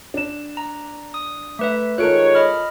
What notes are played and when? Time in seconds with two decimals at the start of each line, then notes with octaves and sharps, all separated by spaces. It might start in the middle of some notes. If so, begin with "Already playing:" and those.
0.14 D4 E7
0.57 A#5
1.14 D#6
1.59 A3 B4 E5
1.98 D#3 G#3 F4 A4 A#4 C#5 F#6 D7
2.35 D#5 B5 F6